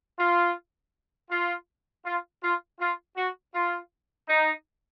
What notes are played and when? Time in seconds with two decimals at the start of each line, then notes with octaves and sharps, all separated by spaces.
0.18 F4
1.31 F4
2.05 F4
2.43 F4
2.80 F4
3.16 F#4
3.55 F4
4.28 D#4